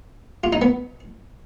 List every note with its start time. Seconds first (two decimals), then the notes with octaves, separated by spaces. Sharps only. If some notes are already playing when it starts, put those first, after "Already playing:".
0.44 F4
0.53 D#4
0.62 B3